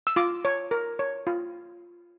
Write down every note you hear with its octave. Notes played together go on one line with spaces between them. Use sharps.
E6
F4 D6
C#5
A#4
C#5
F4